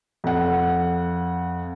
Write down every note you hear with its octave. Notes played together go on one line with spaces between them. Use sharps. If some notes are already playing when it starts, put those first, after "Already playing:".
F2 F#5